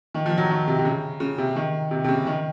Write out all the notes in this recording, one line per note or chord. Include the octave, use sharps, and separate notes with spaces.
D#3
F3
F#3
D#3
C3
C3
C#3
C#3
C3
D#3
C3
C3
C#3
D#3